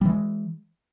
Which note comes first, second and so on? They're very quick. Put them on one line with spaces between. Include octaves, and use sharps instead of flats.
G3 E3 G#3